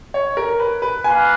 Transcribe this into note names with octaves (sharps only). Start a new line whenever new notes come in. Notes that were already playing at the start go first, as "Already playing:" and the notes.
C#5
A#4
B4
B4
A#3 F4 B4 F5 G#5